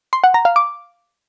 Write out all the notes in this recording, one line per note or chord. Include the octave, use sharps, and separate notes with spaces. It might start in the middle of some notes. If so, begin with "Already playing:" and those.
C6
F#5
A#5
F5
D6